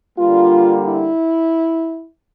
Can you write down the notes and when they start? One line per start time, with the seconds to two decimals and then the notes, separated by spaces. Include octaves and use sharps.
0.18 D3 G3 A#3 F4
0.85 E4